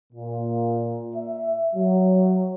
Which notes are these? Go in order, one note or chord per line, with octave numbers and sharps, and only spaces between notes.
A#2
E5
F#3